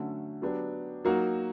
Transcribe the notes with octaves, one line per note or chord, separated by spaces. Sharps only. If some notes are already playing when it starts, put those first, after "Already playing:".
Already playing: D3 F#3 A3 C#4 F#4
F#3 B3 D4 G4
F#3 A#3 D#4 F#4